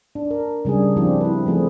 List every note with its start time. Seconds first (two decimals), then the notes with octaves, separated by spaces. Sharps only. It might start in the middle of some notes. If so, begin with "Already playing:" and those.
0.15 D4
0.31 A#4
0.65 C#3 G3 D4 G#4
0.97 F3 C4 D4 E4 F4 G4
1.21 E4 B4
1.46 F3 A3 C4 G#4